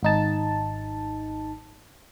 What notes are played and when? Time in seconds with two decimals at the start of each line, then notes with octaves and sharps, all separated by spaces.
0.03 G#1 D#4 A5